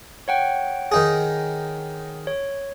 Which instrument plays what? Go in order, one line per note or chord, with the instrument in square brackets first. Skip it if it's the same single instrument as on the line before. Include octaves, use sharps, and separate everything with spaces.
[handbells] C#5 F#5 G5
[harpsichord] D#3 D#4 G#4
[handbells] C#5